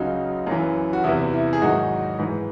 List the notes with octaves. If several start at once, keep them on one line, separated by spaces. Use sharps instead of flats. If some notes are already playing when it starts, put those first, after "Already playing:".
Already playing: C#2 C#3 F#3 D#4 F#4
F#2 E3
F#4
E2 C3 E3 E4
E4
G#4
G#2 D#3 F#3 D#4 F#4
G#2 E3